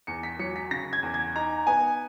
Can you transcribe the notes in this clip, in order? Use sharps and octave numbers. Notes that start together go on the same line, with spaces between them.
E2 C#7
B6
F#3 C#7
B6
C#3 A#6
G#6
E2
G#6
D#4 A#5
B3 G#5